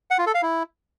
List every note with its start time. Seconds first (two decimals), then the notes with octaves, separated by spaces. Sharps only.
0.11 F#5
0.19 F4
0.27 A4
0.35 F5
0.42 E4